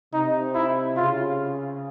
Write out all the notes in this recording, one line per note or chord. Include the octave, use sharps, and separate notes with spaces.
C3 D#4
E4
C#3 F4